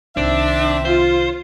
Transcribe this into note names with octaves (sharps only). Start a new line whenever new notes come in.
C2 D#3 C4 D4 E5
F4 C5